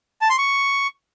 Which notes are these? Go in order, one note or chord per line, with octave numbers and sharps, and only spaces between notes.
A5
C6
C#6